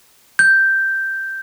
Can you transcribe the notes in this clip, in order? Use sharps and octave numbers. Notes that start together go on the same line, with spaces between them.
G6